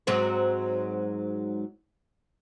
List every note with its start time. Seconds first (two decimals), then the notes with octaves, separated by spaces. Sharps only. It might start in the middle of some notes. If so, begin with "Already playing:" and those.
0.07 G#2 F#3 C4